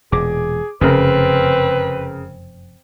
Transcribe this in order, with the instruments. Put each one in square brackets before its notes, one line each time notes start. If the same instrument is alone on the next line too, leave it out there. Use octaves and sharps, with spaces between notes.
[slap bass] E1 A#2 [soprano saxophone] G#4 [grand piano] D6
[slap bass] F1 F#2 [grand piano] C#3 A#4 [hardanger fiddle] C4 [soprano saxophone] B4